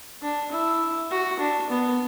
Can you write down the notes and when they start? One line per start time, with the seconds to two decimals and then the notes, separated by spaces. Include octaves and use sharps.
0.22 D4
0.51 E4
1.11 F#4
1.39 D4
1.70 B3